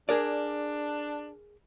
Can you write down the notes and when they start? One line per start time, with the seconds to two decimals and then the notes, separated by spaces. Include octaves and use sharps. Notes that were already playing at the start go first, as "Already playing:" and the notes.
0.09 D4 G#4 A#4 D5